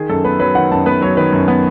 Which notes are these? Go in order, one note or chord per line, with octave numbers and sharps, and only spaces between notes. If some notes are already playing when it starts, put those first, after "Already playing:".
Already playing: D#3 G#4
F#2 A4
B3 B4
F#3 B4
D#3 F#5
F#2 A5
B3 B4
F#3 C#5
D#3 B4
F#2
B3